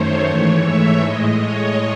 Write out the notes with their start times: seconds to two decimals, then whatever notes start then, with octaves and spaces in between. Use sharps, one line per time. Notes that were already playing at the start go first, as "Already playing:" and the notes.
Already playing: F#2 D#3 A3 C5 C#5
0.27 G#2 E3 A3 C#5
0.65 E5
1.02 A2 G#3 D#5
1.38 C#5